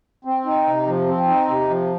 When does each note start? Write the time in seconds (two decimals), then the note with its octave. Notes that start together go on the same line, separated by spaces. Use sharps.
0.25 C4
0.46 D#4
0.66 C3
0.86 F3
1.08 C4
1.28 D#4
1.48 C3
1.69 F3